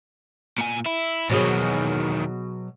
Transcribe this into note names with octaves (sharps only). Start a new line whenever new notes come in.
A#2 G#5
E4
E2 B2 D#3 F#3 G#4